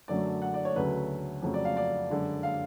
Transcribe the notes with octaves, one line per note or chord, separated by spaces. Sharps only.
F#2 D3 F#3 A3 D5
F#5
D5
C#5
D2 C#3 F#3 A3 B4
F2 C#3 F#3 A3
D5
F5
D5
F#2 D3 G#3
F5